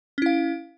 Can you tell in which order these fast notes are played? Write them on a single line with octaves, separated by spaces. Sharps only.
C#4 E4 F5